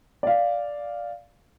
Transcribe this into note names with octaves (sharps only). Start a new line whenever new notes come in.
D5 F5